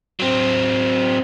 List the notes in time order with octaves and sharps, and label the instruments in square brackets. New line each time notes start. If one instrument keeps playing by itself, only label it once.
[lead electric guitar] F#3 C4